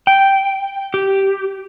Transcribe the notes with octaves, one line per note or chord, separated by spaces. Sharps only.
G5
G4